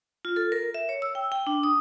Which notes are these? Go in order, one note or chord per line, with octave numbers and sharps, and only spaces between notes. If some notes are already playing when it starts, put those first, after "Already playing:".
F4
A4
A#4
E5
C#5
E6
G5
G5
D4
D#6